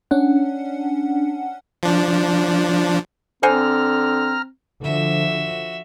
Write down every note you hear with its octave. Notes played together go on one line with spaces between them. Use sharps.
C#4 D4 F#5
F3 D4
D3 C4 C5 F#5 G#5 A#5 F6
D3 F3 F#4 E5